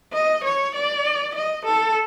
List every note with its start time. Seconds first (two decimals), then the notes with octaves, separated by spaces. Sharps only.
0.13 D#5
0.44 C#5
0.75 D5
1.35 D#5
1.65 A4